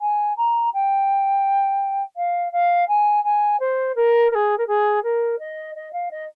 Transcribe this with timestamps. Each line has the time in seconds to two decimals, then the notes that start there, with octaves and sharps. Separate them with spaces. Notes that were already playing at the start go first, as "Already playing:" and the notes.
0.01 G#5
0.37 A#5
0.74 G5
2.16 F5
2.52 F5
2.88 G#5
3.24 G#5
3.60 C5
3.96 A#4
4.31 A#4
4.35 G#4
4.58 A#4
4.67 G#4
5.03 A#4
5.39 D#5
5.75 D#5
5.93 F5
6.11 D#5